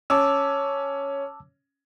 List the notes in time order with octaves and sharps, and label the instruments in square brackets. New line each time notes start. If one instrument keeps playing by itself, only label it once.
[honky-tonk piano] C#4 [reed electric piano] A5 D6 E6